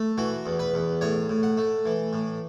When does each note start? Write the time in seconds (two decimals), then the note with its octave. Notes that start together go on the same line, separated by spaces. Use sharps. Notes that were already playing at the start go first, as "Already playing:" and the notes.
Already playing: A3
0.18 E3 F#4
0.46 E2
0.59 B4
0.74 E2
1.01 A2 C#5
1.29 A2
1.43 F#5
1.57 A3
1.85 E3
2.13 A2